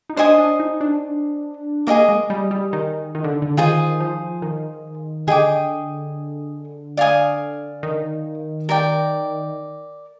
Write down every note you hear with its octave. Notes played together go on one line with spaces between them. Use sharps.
D#4
D4 C5 D#5 G#5 D#6
D4
D#4
D4
A#3 G#4 D#5 A#5 D6
G#3
G3
G3
D#3
D#3
D3
D3
D#3 F4 G#4 C5
F3
D#3
D3 G#4 D#5 G5 D6
D5 F5 G#5 D#6
D#3
A#4 D5 G5